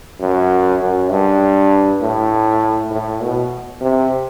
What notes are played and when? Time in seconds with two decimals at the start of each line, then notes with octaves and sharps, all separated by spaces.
0.20 F#2
0.81 F#2
1.11 G2
2.01 A2
2.91 A2
3.21 B2
3.81 C3